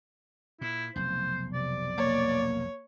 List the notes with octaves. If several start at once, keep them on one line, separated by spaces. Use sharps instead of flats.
A#2 E4
F1 B1 C5
C3 D5
A#3 C#5